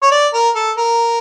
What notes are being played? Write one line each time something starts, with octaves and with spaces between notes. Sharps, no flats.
C#5
D5
A#4
A4
A#4